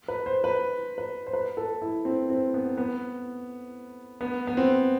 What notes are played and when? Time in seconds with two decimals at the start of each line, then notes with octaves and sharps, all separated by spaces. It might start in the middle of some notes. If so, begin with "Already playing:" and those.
0.08 B4
0.26 C5
0.44 B4
0.98 B4
1.27 C5
1.33 B4
1.57 A4
1.82 E4
2.05 C4
2.30 C4
2.54 B3
2.78 B3
4.21 B3
4.47 B3
4.57 C4